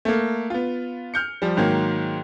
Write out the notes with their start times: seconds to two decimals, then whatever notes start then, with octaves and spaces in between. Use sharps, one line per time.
0.05 A3 A#3
0.50 B3 F4
1.14 F6 G6 C#7
1.42 F3 G3
1.57 G#2 D#3 F#3 A#3